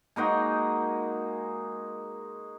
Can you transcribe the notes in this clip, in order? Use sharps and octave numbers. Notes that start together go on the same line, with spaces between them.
G#3 A#3 D#4 F#4